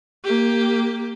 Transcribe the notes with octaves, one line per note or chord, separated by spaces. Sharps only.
A#3 G4